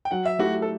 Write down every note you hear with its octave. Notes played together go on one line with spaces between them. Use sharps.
G5
F#3 F#5
E5
A3 E4 F#4 G4
A4